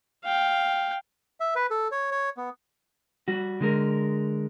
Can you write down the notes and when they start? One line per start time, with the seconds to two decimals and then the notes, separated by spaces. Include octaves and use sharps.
0.24 F5 G5
1.40 E5
1.55 B4
1.71 A4
1.91 C#5
2.11 C#5
2.37 B3
3.28 G3 F#4
3.60 D3 G#3 A#4